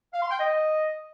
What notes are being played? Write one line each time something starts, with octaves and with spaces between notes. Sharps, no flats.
F5
C6
G5
D#5